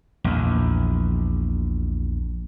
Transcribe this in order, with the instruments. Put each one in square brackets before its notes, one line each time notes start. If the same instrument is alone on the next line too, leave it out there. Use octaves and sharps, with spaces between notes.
[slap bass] A#1 E2